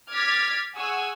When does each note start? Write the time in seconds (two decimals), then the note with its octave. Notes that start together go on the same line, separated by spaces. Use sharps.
0.10 D6 F6 G#6 A6 B6
0.75 G#4 F#5 G#5 C#6 E6